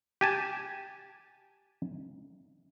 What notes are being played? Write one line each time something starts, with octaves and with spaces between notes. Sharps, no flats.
G4 G#5 A5